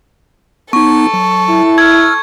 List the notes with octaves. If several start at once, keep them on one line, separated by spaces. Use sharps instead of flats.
B3 D#4 A4 C#6
F#3
E4
E6 F6 G#6